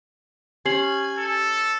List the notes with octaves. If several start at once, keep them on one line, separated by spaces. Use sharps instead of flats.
C#4 G4 G#5 C7 F#7
A4